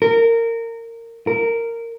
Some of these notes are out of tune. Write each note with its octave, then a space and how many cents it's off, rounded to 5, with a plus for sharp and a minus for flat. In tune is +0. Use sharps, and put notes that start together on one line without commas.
A#4 -20
A#4 -15